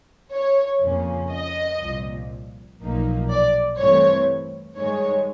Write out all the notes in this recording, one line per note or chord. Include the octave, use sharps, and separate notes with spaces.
C#5
F2 C#3 F3 A#3 C#4
D#5
C2 A#2 F3
B1 A#2 F3 A#3 D#4
D5
G2 E3 A3 C4 C#5
G2 D#3 G#3 C#5